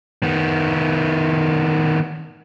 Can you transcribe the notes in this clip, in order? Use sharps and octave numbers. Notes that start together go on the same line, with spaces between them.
D#3 B3